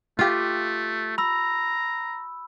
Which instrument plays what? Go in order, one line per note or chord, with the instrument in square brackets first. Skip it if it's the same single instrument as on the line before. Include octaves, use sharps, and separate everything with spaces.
[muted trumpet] A3 [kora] F4 G4
[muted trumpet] A#5 [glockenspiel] B5 E6